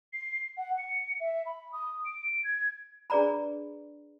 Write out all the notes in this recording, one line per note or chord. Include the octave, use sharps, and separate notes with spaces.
C7
F#5
C#7
E5
B5
D#6
D7
G#6
D4 G#4 B4 D5 A#5 B5